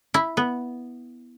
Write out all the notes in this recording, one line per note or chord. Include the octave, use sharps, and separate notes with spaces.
E4
B3